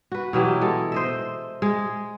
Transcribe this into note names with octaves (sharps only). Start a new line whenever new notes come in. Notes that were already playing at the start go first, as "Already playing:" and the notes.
F#4 B4
B2 E3 F#3 G4
G#3 A4
C5 D#5 E5
G#3